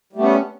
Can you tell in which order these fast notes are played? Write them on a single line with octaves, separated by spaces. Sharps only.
G3 A3 B3 C#4